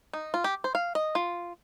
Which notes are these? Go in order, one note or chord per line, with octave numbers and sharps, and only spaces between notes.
D#4
F4
G4
C5
F5
D#5
F4